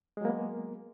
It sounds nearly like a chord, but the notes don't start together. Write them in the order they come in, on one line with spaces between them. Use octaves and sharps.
G#3 F#3 A#3 B3